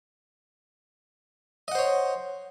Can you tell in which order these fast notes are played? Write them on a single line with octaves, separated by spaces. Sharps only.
D#5 F#5 C5 C#5